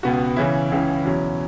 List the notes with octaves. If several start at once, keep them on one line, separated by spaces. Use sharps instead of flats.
C#2 B2 B3 F#4
C#3 E3 C#4 E4
C#2 C#3 E3 C#4 E4
E2 B2 F#3 C#4 E4